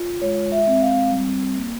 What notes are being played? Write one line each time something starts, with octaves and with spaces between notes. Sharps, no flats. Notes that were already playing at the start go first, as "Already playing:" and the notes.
Already playing: F4
G#3 C#5
E5
C4
F5
G3
A#3